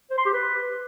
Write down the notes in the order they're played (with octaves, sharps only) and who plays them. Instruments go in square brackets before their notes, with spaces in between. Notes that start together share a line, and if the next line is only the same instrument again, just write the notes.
[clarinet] C5
C6
G4
B4